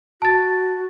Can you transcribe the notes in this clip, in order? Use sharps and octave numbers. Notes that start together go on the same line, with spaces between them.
F#4 A5 A6